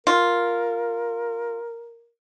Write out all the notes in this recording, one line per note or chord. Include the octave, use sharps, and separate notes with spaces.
F4 A#4